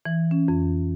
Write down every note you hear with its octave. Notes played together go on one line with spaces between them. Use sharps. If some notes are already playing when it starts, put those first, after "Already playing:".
E3
C#4
F2